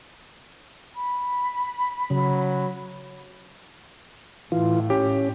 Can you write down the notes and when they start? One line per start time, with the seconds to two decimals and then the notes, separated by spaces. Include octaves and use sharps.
0.94 B5
2.10 C#3 F#3
4.52 A2 E3 F4
4.90 C#4 G4